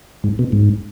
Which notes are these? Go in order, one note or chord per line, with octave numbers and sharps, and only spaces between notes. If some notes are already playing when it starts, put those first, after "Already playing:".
G#2
B2
G#2